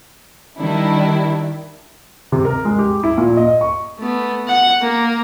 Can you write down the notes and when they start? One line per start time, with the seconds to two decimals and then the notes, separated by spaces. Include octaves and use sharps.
0.58 D#3 G3 D4 E4
2.32 C3
2.45 A#4
2.65 G#3
2.79 G4
3.03 E4
3.18 A#2
3.37 D#5
3.61 C#6
3.99 A3 B3
4.48 F#5
4.82 A#3